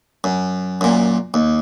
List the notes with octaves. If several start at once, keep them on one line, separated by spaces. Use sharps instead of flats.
F#2
F#2 A#2
D#2